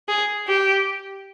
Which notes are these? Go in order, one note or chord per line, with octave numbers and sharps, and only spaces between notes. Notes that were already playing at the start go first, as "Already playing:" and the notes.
G#4
G4